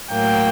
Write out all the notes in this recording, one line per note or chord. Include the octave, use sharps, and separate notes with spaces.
A2 F#3 A#3 G5